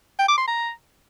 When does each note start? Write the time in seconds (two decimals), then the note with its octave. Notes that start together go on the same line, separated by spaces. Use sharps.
0.19 G5
0.28 D6
0.38 C6
0.47 A#5